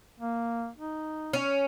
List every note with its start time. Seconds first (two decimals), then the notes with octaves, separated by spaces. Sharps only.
0.19 A#3
0.77 D#4
1.33 C#4